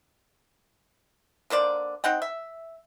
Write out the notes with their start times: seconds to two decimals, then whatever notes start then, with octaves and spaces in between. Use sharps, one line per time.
1.50 D3 A#3 C5 D5
2.04 C4 D#4 F#5 G5
2.22 E5